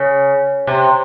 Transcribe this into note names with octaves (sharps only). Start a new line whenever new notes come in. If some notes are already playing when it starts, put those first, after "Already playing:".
Already playing: C#3
C3